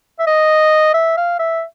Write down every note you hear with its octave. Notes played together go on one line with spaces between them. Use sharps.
E5
D#5
E5
F5
E5